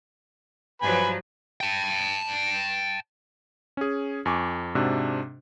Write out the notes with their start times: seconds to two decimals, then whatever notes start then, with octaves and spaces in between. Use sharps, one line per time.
0.82 G2 F3 F#3 B4 G#5 B5
1.61 G5 A5
3.77 C#4 G#4
4.26 F2 G#5 C#6 D6
4.75 G#2 C3 D4 F#4